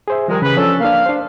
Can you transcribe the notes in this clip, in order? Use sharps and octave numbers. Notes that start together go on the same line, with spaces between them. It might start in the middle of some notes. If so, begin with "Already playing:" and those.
G#4 C5 E5
D#3 F3 G3 G#3 A#4
C#3 E3 G#4 B4
F3 C#4 D4 A4
A#3 D4 F5
D4 C5